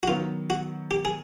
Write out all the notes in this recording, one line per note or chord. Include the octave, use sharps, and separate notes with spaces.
F#4
D#3 F#3 B3 F4
F#4
G4
G#4